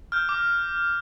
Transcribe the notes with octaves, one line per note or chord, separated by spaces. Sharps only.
F6 G6
D6